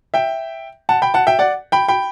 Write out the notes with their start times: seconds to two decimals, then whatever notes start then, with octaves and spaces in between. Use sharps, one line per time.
0.14 E5 G5
0.89 F#5 A5
1.02 G5 B5
1.14 F#5 A5
1.27 E5 G5
1.39 D5 F#5
1.72 G5 B5
1.88 G5 B5